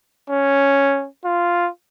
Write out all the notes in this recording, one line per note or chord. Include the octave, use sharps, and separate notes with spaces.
C#4
F4